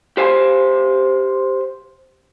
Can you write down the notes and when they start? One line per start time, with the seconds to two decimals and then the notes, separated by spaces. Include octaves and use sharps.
0.17 G4 C5 F5 G#5